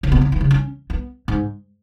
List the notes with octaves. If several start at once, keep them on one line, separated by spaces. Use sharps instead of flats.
C#3
B2
C#3
E3
C#3
C#4
B3
G#2